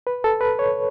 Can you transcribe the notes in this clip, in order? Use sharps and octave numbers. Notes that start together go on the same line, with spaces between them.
B4
A4
B4
C#5